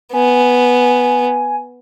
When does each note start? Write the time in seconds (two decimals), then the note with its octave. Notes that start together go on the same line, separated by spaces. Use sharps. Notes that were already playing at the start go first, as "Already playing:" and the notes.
0.13 B3 G#5